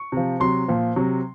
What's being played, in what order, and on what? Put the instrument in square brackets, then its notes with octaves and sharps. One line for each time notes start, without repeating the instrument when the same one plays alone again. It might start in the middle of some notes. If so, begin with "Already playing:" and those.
Already playing: [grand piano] C#6
C3 F3
C3 F#3 C6
A#2 F3
C3 F#3